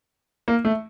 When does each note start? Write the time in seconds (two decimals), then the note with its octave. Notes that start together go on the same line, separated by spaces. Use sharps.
0.48 A#3
0.65 A3